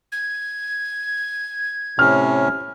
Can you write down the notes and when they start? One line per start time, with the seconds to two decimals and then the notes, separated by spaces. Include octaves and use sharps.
0.12 G#6
1.99 A2 C3 C#4 F6